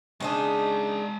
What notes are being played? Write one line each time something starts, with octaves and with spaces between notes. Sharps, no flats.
C#3 G#3 D4 D#4 A5